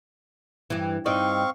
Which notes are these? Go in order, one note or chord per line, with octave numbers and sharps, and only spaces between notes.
G2 E3
G2 C4 D#4 D5 F5 C#6